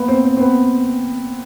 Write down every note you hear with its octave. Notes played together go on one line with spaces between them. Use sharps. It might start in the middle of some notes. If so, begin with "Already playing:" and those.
Already playing: A#3 B3
C4
C4
C4
B3